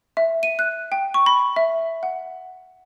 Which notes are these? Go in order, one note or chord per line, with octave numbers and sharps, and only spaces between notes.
E5
D#7
F#6
G5
C#6
B5
E5
F#5